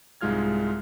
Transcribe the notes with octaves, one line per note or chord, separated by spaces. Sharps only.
C2 G#2 G#3 F4 F6 G#6